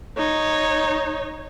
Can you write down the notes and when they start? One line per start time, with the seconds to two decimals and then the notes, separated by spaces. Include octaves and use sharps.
0.18 D#4 C#5